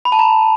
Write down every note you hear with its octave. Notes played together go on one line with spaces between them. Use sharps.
B5
A5
A#5